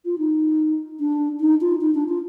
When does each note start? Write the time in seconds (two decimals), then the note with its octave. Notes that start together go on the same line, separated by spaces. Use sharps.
0.05 F4
0.18 D#4
1.00 D4
1.41 D#4
1.61 F4
1.81 D#4
1.95 D4
2.09 F4